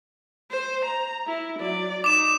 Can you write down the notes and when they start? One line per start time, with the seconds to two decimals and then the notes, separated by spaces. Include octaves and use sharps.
0.50 C5
0.85 A#5
1.27 E4
1.59 F#3 D5
2.04 D#4 D6 E7